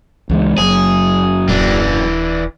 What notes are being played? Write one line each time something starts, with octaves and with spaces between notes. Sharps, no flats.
C#2 E3 G#3
F#1 F#3 G#4
D#1 E3 D4